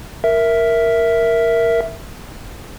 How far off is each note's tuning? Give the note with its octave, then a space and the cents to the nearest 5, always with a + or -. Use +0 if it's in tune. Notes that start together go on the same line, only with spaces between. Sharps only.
A#4 +0 E5 +0